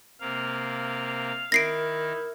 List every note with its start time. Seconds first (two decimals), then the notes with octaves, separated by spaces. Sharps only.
0.21 C3 A#3 F5
1.52 D#3 D#4 E4 A#4 A#6 C7 D7